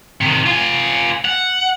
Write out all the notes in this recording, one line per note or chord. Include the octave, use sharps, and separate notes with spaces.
C3 D#3
F4 G#5
F#5